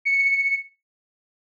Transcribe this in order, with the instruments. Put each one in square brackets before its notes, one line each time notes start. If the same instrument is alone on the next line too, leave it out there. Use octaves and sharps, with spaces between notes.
[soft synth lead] C#7